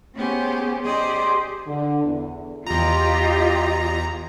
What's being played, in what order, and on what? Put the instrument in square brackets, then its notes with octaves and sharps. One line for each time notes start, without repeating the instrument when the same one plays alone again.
[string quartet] B3 C#4 G4 G#4 C5
G4 G#4 C5 D5 D#5
[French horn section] D3
E2
[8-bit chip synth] E2 A#5 [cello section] F4 G4 D#5